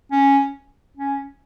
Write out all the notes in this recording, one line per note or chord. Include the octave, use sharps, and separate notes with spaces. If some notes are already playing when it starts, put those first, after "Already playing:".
C#4
C#4